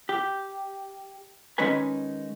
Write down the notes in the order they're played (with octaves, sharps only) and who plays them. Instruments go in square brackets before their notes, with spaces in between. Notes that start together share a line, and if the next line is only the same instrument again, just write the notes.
[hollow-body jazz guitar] G4
D#3 G#3 C#4 D#4 B4 G#5